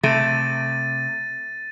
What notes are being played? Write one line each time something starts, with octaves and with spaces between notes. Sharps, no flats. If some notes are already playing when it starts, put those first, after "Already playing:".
C3 A3 A6 D#7